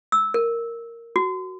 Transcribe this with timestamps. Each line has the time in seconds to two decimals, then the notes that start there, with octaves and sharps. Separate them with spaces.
0.12 E6
0.34 A#4
1.16 F#4